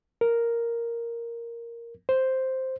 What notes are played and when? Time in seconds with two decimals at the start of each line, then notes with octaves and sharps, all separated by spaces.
0.21 A#4
2.09 C5